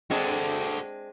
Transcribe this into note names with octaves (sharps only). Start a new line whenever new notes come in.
G#3 C4 D4 F#4 A4